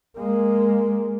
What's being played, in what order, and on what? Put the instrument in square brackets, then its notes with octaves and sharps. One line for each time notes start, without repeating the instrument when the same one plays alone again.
[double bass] G#3 A#3